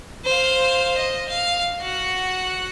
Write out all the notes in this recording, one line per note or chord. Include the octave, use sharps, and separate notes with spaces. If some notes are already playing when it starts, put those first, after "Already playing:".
C5 F5
D#5
F5
F#4 F#5